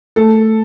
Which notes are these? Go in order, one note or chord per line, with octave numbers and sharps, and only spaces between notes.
A3 A4